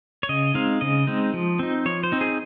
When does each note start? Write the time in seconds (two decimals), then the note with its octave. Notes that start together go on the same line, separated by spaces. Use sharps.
0.23 C#5
0.29 C#3 D#5
0.54 G#3 C4 D#4 F5
0.81 C#3 D#5
1.07 G#3 C4 D#4
1.34 F3
1.59 C4 D#4
1.85 F3 C#5
2.03 C5
2.12 C4 D#4
2.21 G#4